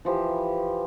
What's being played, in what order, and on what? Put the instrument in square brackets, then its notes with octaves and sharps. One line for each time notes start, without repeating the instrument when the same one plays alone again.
[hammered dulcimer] E3 F3 G4